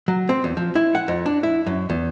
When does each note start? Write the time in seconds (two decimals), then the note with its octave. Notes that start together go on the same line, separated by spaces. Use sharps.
0.08 F#3
0.29 C4
0.44 E2
0.57 F3
0.75 E4
0.95 F#5
1.08 F2
1.26 D4
1.43 E4
1.66 F#2
1.90 E2